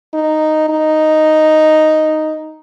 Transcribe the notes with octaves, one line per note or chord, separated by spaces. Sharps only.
D#4
D#4